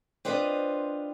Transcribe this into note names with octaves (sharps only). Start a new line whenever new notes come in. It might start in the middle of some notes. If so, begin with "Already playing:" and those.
C4 D4 F4 B4 C5 D#5